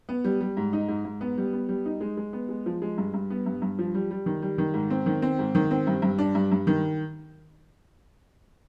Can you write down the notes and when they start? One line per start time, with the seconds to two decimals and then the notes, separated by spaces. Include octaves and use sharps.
0.09 B3
0.24 G3
0.41 G3
0.57 G#2
0.73 D#4
0.88 G#2
1.05 G#2
1.21 B3
1.38 G3
1.53 B3
1.69 G3
1.86 D#4
2.01 G#3
2.17 G#3
2.33 B3
2.49 G#3
2.66 F3
2.82 G#3
2.98 G2
3.14 G2
3.30 B3
3.46 G2
3.62 G2
3.79 F3
3.94 G3
4.11 G3
4.26 D#3
4.42 G3
4.58 D#3
4.74 G#2
4.90 C4
5.06 D#3
5.22 C4
5.39 G#2
5.55 D#3
5.71 C4
5.87 G2
6.02 G2
6.19 D4
6.35 G2
6.52 G2
6.67 D#3